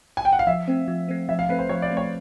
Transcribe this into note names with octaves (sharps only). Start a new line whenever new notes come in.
G#5
G5
F#5
F5
F3 E5
A3 C4
F3
A3 C4
F3 E5
F5
A3 C4 B4
C5
F3 C#5
D5
A3 C4
C#5